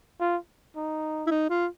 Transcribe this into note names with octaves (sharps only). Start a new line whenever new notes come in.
F4
D#4
E4
D#4
F4